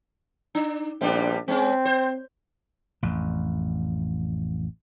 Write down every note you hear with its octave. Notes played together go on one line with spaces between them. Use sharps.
D4
A#1 G3 B3 D4
G#3 C4 C#4
C5
A1 F2